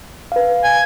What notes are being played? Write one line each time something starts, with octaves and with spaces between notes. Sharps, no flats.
B4 F5
G#5